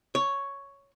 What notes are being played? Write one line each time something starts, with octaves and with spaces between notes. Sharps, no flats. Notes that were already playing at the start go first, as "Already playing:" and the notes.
C#5